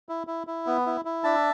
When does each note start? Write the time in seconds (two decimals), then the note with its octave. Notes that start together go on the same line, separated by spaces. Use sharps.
0.09 E4
0.27 E4
0.47 E4
0.67 B3
0.86 E4
1.05 E4
1.24 D4 E5 A5